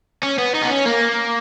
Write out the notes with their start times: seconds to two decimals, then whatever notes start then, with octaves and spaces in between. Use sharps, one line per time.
0.23 C#4
0.38 B3
0.54 D#4
0.62 B3
0.69 C#4
0.85 A#3